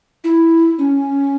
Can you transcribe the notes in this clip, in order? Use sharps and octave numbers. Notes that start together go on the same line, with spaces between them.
E4
C#4